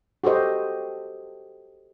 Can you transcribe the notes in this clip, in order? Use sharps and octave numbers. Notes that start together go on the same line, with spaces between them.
F#4 G4 A4 C5 D#5